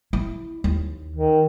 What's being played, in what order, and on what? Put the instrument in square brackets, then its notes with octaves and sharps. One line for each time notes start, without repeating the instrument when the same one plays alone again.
[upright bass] E4
D#2
[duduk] D#3